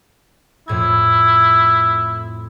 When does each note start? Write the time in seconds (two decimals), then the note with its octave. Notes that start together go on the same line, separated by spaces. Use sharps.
0.68 F2 A2 E4 G#6